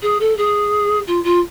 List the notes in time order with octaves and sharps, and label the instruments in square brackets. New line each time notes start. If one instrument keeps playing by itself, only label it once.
[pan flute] G#4
A4
G#4
F4
F4